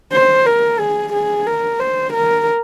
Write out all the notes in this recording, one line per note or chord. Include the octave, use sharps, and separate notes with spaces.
C5
A#4
G#4
G#4
A#4
C5
A#4